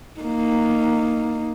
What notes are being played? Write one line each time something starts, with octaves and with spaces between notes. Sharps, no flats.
A#3 D#4